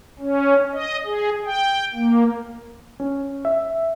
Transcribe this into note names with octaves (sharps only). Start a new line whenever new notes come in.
C#4
D#5
G#4
G5
A#3
C#4
E5